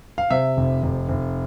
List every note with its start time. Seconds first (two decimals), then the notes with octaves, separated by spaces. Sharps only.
0.18 F5
0.30 C3 E5
0.57 F1
0.83 F1
1.09 F1